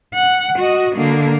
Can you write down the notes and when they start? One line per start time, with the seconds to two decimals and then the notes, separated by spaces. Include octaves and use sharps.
0.14 F#5
0.58 F#4 D#5
0.96 D3 A#3